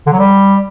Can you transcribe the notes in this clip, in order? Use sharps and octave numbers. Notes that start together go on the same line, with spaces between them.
D3
F#3
G3